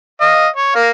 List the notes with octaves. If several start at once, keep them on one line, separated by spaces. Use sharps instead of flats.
D#5 F5
C#5
A#3 F5